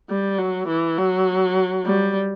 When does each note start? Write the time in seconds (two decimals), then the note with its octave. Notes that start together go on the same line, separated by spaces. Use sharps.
0.09 G3
0.38 F#3
0.68 E3
0.98 F#3
1.85 G3